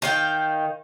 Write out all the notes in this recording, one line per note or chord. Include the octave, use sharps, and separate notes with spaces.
D#3 F5 G5